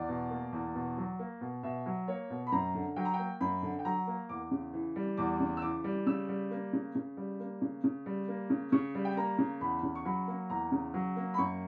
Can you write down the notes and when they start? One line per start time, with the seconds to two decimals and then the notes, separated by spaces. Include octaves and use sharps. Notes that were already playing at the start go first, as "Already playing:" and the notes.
Already playing: E2 D5
0.09 B2
0.30 A#3
0.53 E2
0.75 B2
0.97 F#3
1.19 A#3
1.41 B2
1.63 B2 E5
1.86 F#3
2.08 A#3 C#5
2.30 B2
2.47 B5
2.52 F#2 A#5
2.74 D3
2.96 F#3 G5
3.05 A#5
3.14 G5
3.19 A#3
3.41 F#2 B5
3.63 D3
3.79 G5
3.85 F#3 A#5
4.07 A#3
4.29 E2 D6
4.51 C#3
4.74 E3
4.96 G3
5.17 E2 D6
5.40 C#3
5.57 E6
5.62 E3 D6
5.84 G3
6.06 C#3 E6
6.29 G3
6.51 A#3
6.73 C#3
6.95 C#3
7.17 G3
7.40 A#3
7.62 C#3
7.84 C#3
8.06 G3
8.28 A#3
8.50 C#3
8.72 C#3 C#6
8.95 G3
9.05 G5
9.17 A#3 A#5
9.38 C#3
9.61 E2 B5
9.83 C#3
9.95 C#6
10.05 F#3 B5
10.27 A#3
10.50 E2 A#5
10.72 C#3
10.94 F#3
11.16 A#3
11.34 B5
11.38 F#2 C#6